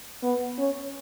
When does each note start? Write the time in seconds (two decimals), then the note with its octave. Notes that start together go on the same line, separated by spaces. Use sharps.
0.23 B3
0.58 C#4